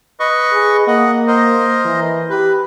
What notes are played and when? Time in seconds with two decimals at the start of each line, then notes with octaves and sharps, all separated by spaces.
0.20 B4 D#5 C#6
0.53 G#4
0.87 A#3 D#5 F#5
1.27 A#4 C5 D#5
1.85 E3
2.30 G4 B4